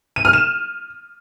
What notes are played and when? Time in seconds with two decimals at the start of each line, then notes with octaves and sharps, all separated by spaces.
0.16 D#7
0.25 F6
0.33 E7